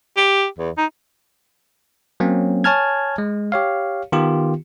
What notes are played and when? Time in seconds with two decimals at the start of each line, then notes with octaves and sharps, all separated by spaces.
0.17 G4
0.59 E2
0.77 D#4
2.20 F#3 A#3 C4 C#4
2.64 C#5 G#5 A5 F6 G#6
3.18 G#3
3.52 G4 C#5 F5
4.12 D#3 B3 F4 G4